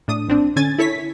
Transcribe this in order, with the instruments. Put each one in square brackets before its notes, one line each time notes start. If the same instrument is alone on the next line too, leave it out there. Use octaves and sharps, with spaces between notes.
[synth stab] A2 D4 D#6
A#1 C4 D4
D3 C#4 G#5 G#6 A6
E4 A4 C#5 B6